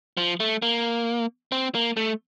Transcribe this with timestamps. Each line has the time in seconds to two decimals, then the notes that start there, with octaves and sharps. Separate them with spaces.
0.17 F3
0.40 A3
0.62 A#3
1.52 C4
1.75 A#3
1.97 A3